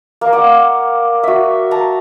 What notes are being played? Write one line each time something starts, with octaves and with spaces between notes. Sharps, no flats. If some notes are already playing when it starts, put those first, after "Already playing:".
A#3
D5 F#5
F#4 E5
A5 A#5